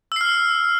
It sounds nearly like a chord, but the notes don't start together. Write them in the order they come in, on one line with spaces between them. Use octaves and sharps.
E6 C7 F6